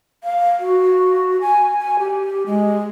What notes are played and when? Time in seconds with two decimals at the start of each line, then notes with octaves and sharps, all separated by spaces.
0.24 F5
0.60 F#4
1.41 G#5
1.79 G#5
1.99 G4
2.46 G#3